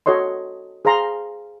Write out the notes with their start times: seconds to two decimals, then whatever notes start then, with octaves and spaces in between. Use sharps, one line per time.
0.06 F#4 A4 C#5 D#5 C6
0.85 G#4 C5 F5 A#5 C6